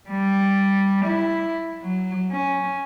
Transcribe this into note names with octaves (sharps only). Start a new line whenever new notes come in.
G3
E4
F#3
C#4